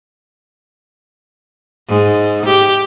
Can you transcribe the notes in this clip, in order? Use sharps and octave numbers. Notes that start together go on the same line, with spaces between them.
G#2
G4